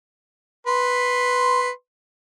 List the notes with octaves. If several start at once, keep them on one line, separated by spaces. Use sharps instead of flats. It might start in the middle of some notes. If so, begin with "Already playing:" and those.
B4 C6